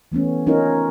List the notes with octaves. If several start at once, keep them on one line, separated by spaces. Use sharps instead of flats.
E3 A3 B3 C#4
C#4 D#4 F4 A#4 C#5